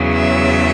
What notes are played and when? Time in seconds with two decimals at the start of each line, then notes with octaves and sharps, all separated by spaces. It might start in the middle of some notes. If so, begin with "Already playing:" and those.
Already playing: E2 C#3 F#3
0.13 E5